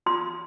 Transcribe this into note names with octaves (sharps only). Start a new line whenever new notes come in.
F4 C6